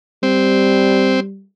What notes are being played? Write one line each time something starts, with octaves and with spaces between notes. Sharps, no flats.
G3 C4